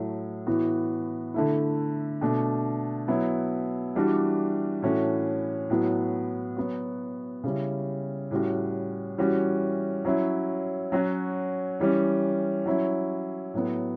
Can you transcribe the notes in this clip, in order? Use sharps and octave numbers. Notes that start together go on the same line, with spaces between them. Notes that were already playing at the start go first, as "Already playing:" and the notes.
Already playing: A2 F#3 A3
A2 E3 B3 F#4
D3 A3 E4
B2 A3 D4
F#3 B3 E4
E3 G3 D4 F#4
A2 E3 A3 C#4 F#4
A2 F#3 B3 F#4
F#3 B3 F#4
C#3 G3 C#4 E4
A2 G3 C#4 F#4
E3 G3 C#4 F#4
F#3 C#4 E4
F#3 C#4 F#4
E3 G3 C#4
F#3 C#4 E4
A2 F#3 B3